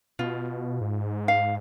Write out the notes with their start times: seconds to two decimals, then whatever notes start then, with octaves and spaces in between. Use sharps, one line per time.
0.19 B2 F4
0.81 G#2
1.28 F5